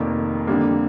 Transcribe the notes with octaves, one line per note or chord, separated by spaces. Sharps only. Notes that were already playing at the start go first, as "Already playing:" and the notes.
Already playing: F1 F2 D#3 A#3
F2 D3 G3 A#3